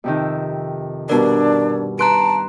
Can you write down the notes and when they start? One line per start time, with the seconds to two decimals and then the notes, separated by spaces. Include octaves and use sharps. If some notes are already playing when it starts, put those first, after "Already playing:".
0.04 F2 C3 D#3
1.09 G2 B2 D4 A#4 B4 D5
1.99 B4 A5 A#5 C6 F#6 D7